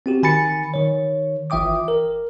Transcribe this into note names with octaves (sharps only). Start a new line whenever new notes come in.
C4 F#4 G4
D#3 G#5 B5 A6 C#7
D#3 C#5
G1 E3 E5 G5 D6 D#6
A#4